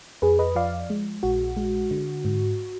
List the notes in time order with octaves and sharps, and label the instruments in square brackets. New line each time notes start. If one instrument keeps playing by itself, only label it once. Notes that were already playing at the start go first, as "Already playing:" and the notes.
[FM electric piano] F2 G#4 B4
B4 D#5
F3 D5 F5
G#3
A#1 F#4
G#3
D3
G#2